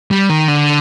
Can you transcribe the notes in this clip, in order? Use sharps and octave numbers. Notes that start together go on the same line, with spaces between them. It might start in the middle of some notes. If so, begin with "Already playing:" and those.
G3
D#3
D3